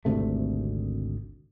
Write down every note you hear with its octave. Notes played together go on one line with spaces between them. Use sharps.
G#1 D2 C3 A3